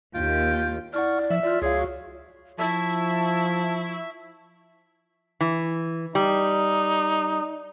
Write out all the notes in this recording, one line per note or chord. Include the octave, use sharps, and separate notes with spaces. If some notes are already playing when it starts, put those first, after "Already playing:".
D#2 F4 G5
E4 D5 F#5 C#6 F6
F3 E5
F4 D5 F6
C#2 G#4 C#5 F5
F#4
F3 E4 E5 A5 C#6
E3
G3 D#4